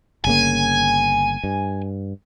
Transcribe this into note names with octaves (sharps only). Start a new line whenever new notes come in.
G1 C#3 A#3 G#5
G2